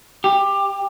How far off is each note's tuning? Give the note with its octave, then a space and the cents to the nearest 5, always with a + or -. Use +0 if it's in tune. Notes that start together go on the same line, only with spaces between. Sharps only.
G4 +15